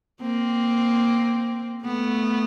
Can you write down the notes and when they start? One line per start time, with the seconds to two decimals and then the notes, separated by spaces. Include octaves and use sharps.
0.21 A#3 C4
1.84 A3 B3